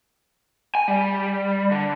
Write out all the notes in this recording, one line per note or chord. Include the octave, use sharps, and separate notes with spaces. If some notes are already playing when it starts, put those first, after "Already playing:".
G#5
G3
D3